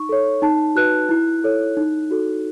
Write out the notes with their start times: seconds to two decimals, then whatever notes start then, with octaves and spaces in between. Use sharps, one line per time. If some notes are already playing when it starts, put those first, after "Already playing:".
Already playing: D#4 C#6
0.09 A4 C#5
0.42 D#4 A5
0.76 F#4 B4 F#6
1.09 E4
1.44 A4 C#5
1.77 D#4
2.11 F#4 A4